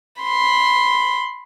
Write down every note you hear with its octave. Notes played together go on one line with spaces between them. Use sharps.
B5 C6